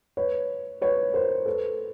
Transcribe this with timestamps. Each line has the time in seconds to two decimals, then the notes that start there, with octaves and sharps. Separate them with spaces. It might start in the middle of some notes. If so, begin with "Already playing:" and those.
0.17 B4 C#5
0.81 B4 C#5
1.14 A#4 C5
1.46 A4 B4